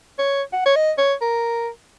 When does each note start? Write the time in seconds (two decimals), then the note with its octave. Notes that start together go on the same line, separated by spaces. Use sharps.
0.19 C#5
0.53 F#5
0.66 C#5
0.76 D#5
0.98 C#5
1.21 A#4